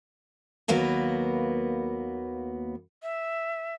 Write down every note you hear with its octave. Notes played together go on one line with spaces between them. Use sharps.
D#2 F#3 A#3 B3 B4
E5